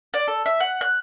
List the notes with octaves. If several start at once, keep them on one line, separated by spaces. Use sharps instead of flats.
D5
A4
E5
F#5
F#6